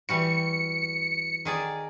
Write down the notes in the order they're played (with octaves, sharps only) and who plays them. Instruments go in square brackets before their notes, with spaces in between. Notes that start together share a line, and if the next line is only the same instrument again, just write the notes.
[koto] E3 G3 F#4 [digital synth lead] C#7
[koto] D#3 G#4 D5